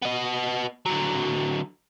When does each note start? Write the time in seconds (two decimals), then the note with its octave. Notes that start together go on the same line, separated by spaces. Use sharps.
0.02 B3 D#5
0.86 D3 F#3